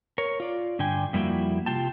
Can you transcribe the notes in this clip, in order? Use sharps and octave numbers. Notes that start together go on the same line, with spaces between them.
A#4 C#5
F4 D5
G2 D3 D4 G5 G#5
F2 G3 A#3 E4 F#4 G5
C3 F4 G5 A5